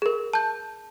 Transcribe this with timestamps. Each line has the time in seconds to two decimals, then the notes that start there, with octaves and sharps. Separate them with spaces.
0.02 G#4 A#4
0.33 A5 G6